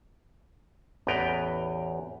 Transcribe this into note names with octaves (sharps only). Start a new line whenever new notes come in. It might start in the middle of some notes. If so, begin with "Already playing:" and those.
A1 E2 B3 B4 G5 A#5